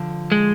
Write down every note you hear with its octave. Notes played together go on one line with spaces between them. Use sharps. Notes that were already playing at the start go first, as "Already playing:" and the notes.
Already playing: D3 F3
G#3